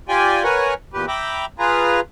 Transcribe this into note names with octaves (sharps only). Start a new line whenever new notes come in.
F4 G4 D5 G5 G#5
A#4 B4 C#5 F#5 G#5 A#5
E2 A#2 G4 B4
E5 G5 A#5 B5 D6
F4 G#4 B4 A#5